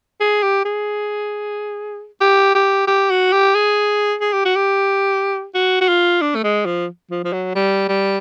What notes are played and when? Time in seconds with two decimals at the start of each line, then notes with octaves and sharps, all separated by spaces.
0.20 G#4
0.42 G4
0.65 G#4
2.21 G4
2.55 G4
2.87 G4
3.10 F#4
3.32 G4
3.55 G#4
4.21 G#4
4.33 G4
4.45 F#4
4.56 G4
5.54 F#4
5.81 F#4
5.88 F4
6.21 D4
6.35 A3
6.43 G#3
6.66 F3
7.10 F3
7.24 F3
7.32 F#3
7.55 G3
7.88 G3